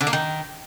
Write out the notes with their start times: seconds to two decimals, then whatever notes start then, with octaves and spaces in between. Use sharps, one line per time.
0.01 D3
0.07 A#3
0.13 D#3